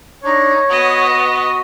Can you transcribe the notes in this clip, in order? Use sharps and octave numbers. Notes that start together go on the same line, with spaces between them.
D4 D#4 C#5
B3 F#4 D#5 D#6